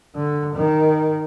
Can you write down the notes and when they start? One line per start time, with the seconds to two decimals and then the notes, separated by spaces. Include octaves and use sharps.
0.15 D3
0.55 D#3